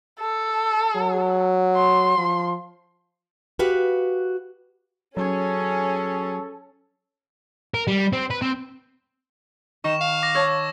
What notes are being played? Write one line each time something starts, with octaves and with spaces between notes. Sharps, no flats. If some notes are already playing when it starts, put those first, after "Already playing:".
A4
F#3
C6
F3
F#4 G4 B4 F5
F#3 C#4 G#4 A4 C#5
A#4
G3
C4
B4
C4
D#3 D#4 C#6 E7
F5
D6 A#6
C#5 A5 E6 G#6